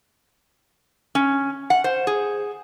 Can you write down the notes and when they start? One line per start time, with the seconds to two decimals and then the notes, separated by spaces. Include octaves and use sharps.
1.15 C#4
1.70 F#5
1.84 C5
2.07 G#4